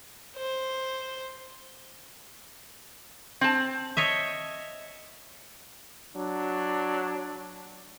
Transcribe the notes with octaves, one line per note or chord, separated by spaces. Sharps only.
C5
C4 A5
C#5 D#5 E5
F#3 D4